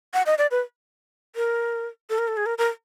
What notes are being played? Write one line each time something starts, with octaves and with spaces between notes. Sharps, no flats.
F#5
D#5
D5
B4
A#4
A4
A#4
A4
G#4
A#4
A#4